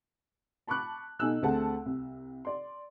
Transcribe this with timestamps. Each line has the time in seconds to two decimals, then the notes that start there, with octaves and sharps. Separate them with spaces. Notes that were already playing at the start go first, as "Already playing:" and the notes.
0.67 A5 B5 C#6 D6 F#6
1.19 B2 D#4 A4 G#5 E6 F#6
1.42 D2 A3 C4 G#4 F#5 A5
1.86 C2
2.45 D5 C6